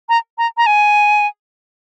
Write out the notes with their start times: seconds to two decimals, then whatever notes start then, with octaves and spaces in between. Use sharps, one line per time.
0.09 A#5
0.38 A#5
0.57 A#5
0.66 G#5